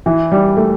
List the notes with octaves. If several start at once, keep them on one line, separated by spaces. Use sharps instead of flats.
E3
G3
A3